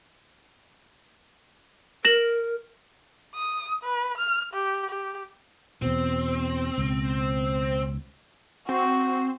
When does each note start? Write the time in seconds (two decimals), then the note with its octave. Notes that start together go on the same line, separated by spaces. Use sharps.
2.05 A#4 A#6 E7 F#7
3.34 D#6
3.84 B4
4.18 F6
4.54 G4
4.90 G4
5.82 E2 B2 C4
6.78 C#2 B2
8.69 C4 F#4